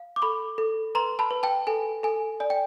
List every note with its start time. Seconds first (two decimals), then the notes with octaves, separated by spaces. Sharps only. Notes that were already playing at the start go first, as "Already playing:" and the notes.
Already playing: F5
0.16 D6
0.22 A4 B5 C#6
0.58 A4
0.95 B4 A#5 C6
1.19 A5 B5
1.31 B4
1.43 G5 A5
1.67 A4 G#5
2.03 A4 G#5
2.40 D5 G#5
2.50 G5